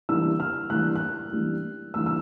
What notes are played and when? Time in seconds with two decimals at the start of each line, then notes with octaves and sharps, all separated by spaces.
0.09 E3 G3 A#3 D4 E6
0.40 F6
0.70 E3 G3 A#3 D4 F#6
0.96 F#6
1.32 E3 G3 A#3 D4
1.94 E3 G3 A#3 D4 E6
2.06 E6